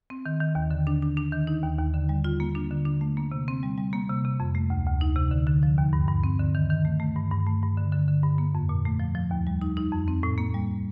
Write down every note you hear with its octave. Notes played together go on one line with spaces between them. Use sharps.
C4
D#3
D#3
D#2
D3
D4
D4
D4
D#3
D#4
D#2
D#2
D3
G3
F4
A#3
D4
D3
D4
A3
A#3
C3
C4
G3
G3
A#3
C3
C3
F2
A3
D2
D2
D#4
C3
D3
D3
F3
D#2
G2
G2
C4
D3
D#3
D#3
A3
A3
G2
G2
A3
G2
D3
D3
D3
G2
A#3
F2
A#2
A3
F3
F3
D#2
G3
D#4
D#4
F2
C4
A2
A#3
G3